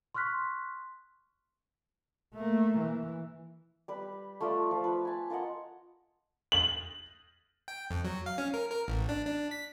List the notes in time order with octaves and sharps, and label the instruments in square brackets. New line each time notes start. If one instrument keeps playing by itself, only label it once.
[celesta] C6 C#6 F6 F#6 B6
[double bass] A3 A#3
E3
[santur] G3 B4
A3 F4 B4 D5
F3
B4 E6
G#5 A5
F4 A#4 D#5 F#5
[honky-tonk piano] F#7
[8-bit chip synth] G5
F2
F#3
F5
C#4
A#4
A#4
A1
D4
D4
B6